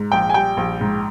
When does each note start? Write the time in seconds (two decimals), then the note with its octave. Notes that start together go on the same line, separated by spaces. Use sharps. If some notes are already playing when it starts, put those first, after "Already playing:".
Already playing: G#2
0.12 A#1 G5
0.30 G#5
0.34 G3 G5
0.57 A#1
0.81 G#2